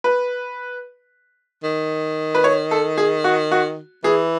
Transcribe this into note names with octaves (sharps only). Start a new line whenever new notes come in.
B4
D#3
B4
C#5
A4
G#4
F#4
F#4
E3 G#4